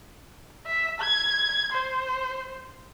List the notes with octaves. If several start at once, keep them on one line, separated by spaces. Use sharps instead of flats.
E5
G#6
C5